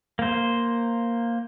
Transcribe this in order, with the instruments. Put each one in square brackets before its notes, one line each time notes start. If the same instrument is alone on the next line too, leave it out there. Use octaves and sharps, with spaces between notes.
[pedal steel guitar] A#3 C5